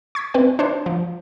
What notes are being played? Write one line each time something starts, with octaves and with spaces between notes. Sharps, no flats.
C#6 G#6 B6
C4 B4 G5
D4 C5 C#5
F3